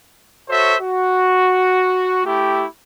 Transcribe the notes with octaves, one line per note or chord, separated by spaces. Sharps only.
F#4 A4 C5 C#5 E5
F#4
A3 E4 G4